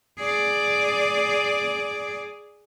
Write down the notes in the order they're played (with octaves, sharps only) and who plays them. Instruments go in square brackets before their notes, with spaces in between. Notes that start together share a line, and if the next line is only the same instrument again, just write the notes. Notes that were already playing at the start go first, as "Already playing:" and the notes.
[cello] G#4 D5